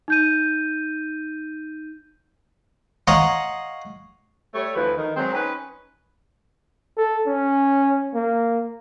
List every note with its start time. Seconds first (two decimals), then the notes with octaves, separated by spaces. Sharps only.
0.08 D#4 G6 D#7
3.07 C#5 D#5 F5 F#5 A#5 C6
4.55 G3 A3 C#5
4.76 D2 E3 F3 B4
4.97 D#3
5.16 F#3 G#3 C4
5.33 C#4 D#4 B4
6.97 A4
7.27 C#4
8.15 A#3